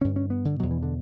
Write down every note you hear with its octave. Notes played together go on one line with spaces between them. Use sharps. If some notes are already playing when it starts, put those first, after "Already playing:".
G2 D3 C#4
C#4
B3
D3
E2 B2 F#3
E3
D3